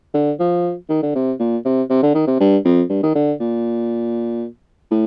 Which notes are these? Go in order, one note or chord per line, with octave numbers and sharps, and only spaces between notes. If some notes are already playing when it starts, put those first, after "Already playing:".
D3
F3
D#3
D3
C3
A#2
C3
C3
D3
D#3
C3
G2
F2
G2
D#3
D3
A#2
A2